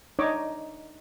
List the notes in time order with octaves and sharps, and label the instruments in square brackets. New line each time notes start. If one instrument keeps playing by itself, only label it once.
[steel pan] D4 D#4 C#5 D#5 D6